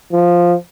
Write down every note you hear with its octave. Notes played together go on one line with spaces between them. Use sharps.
F3